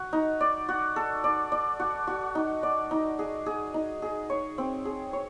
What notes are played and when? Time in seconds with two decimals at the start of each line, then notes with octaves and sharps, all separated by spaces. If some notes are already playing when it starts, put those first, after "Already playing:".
Already playing: F#4
0.13 D#4
0.41 D5
0.69 F#4
0.96 A4
1.24 D5
1.52 D5
1.80 F#4
2.07 F#4
2.35 D#4
2.63 D5
2.91 D#4
3.19 G#4
3.46 G#4
3.74 D#4
4.02 G#4
4.30 C#5
4.58 C4
4.85 G#4
5.13 C#5